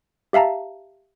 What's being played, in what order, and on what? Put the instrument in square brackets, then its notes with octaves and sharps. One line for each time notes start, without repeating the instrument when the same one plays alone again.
[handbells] G4 E5 F5 A5 A#5